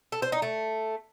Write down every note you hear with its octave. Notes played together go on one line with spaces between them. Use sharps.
A4
C5
D#4
A3